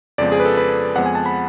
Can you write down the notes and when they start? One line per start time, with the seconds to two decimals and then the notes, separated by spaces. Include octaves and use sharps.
0.18 F2 C#3 F3 G#3 B3 D5
0.32 G#4
0.40 B4
0.45 A4
0.57 B4
0.96 F2 F3 G#3 B3 F#5
1.06 G#5
1.15 A5
1.26 B5